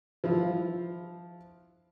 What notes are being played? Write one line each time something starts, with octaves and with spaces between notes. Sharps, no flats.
F3 E4 F4